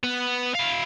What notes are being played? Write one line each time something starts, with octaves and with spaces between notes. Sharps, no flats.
B3
E4 F5